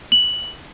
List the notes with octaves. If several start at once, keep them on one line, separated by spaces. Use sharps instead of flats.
F#7